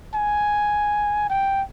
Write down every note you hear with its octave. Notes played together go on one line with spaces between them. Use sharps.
G#5
G5